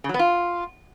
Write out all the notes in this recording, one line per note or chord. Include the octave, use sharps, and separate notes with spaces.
C#3
F#3
B3
F4